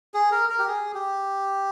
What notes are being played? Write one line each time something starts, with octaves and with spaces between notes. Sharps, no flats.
G#4
A#4
A#4
G4
G#4
G4